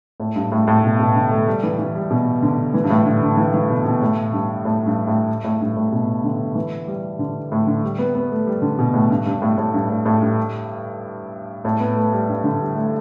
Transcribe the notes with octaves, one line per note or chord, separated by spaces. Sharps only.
A2
G2
A2
A2
B2
B2
D3
A3
G3
E3
E3
G3
B2
D3
E3
G2
A2
D3
D3
E3
E3
B2
B2
A2
G2
A2
G2
A2
A2
G2
A2
B2
D3
E3
G3
D3
A2
D3
G3
B3
B3
A3
G3
D3
B2
A2
G2
G2
A2
A2
G2
A2
A2
G2
A2
B3
A3
G3
G2
D3
G3
A3